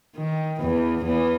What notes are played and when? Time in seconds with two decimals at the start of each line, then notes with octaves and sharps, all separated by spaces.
0.16 D#3
0.61 E2 E3
1.06 E2 E3